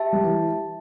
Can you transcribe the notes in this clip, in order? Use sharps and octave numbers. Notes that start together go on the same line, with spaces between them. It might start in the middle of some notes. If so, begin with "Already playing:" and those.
Already playing: G4 E5 A5
G3
E3